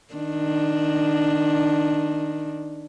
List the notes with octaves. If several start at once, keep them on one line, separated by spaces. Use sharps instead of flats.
D#3 D4